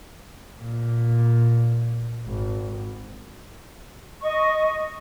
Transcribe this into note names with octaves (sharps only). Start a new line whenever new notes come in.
A#2
G#1
D#5 C#6